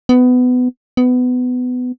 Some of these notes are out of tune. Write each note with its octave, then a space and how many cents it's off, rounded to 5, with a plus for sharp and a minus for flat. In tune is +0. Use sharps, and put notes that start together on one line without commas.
B3 +20
B3 +20